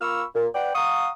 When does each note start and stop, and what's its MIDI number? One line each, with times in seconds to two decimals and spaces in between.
0.01 0.24 58
0.01 0.24 65
0.01 0.24 83
0.01 0.24 85
0.01 0.24 88
0.01 0.24 89
0.35 0.47 46
0.55 0.72 71
0.55 0.72 74
0.55 0.72 78
0.55 0.72 79
0.75 1.10 77
0.75 1.10 78
0.75 1.10 82
0.75 1.10 85
0.75 1.10 87